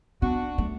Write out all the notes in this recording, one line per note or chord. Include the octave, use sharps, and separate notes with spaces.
B3 D4 F#4
A3